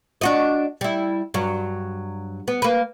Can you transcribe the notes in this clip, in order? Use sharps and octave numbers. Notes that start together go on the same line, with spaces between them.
D4 F#4 D#5
G3 E4
G2 F#3
B3
A#3 B4